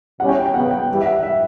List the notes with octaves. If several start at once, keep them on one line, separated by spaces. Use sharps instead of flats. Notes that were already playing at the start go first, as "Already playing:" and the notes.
B2 G3 C#4 E4 F#5
G5
G5
C#3 F#3 B3 F#5
G5
G2 E3 G3
E5
F#5
E5